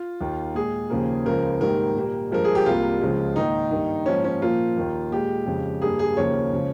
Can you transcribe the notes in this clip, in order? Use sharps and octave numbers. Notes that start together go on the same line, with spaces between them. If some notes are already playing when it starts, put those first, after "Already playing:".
Already playing: F4
D#2 D#3 A#3
A#2 G#3 G#4
D#2 C#3 F3 A#3
C#2 C#3 F3 A#4
G#2 D#3 G3 A#3 A#4
A#2 G3 A#3
G2 F3 G#3 A#4
G#4
G4
C2 C3 G3 A#3 F4
C#2 C#3 F3 G#3
G#2 D#3 A#3 D#4
G2 D#3 A#3
G#2 F3 A#3 C#4
C#4
A#2 F3 A#3 F4
D#2 D#3 A#3
A#2 G#3 G4
F2 C#3 G#3
G2 G3 A#3 G#4
G#4
D#2 C#3 F3 A#3 C#5
C#3 F3 G#3